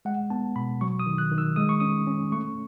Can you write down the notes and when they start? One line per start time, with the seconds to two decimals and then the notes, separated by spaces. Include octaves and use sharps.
0.05 G#3 F#5
0.30 B3 A5
0.56 B2 B5
0.81 F#3 C#6
0.99 D#6
1.06 D#3
1.18 F#6
1.31 D#3
1.38 E6
1.56 G#3 D#6
1.69 C#6
1.80 C#4 D#6
2.07 C#4
2.32 A3 C#6